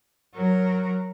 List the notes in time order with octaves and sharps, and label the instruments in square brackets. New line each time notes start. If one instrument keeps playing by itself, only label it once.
[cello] F#3 A#4